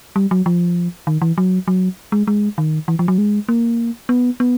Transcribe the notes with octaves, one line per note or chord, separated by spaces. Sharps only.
G3
F#3
F3
D#3
E3
F#3
F#3
G#3
G#3
D#3
E3
F3
F#3
G#3
A#3
B3
B3